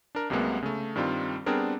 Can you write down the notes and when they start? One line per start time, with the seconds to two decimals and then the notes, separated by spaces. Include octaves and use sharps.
0.15 D4 A#4
0.30 C2 C3 F#3 G#3 A#3 B3
0.63 C#3 A3
0.96 G2 D#3 G3 C4 F4
1.46 G3 B3 C4 D4 G#4 A#4